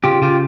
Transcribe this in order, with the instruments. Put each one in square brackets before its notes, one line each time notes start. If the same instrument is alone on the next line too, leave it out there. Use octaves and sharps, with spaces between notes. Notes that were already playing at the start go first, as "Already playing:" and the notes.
[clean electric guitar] C#3 F4 G4
C#3 F4 G4